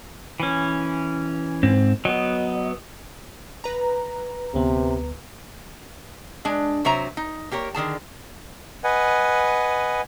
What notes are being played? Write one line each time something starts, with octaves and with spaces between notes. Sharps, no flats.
E3 C#4
G#2 C4
F#3 B3 D#5
B4 A#5
D2 C3 B3
G#3 D4
C3 F#3 C5 E5 A#5
D#4
A#3 G4 A#4 C#5
D3 D#3 G#4 A5
B4 D#5 F#5 G#5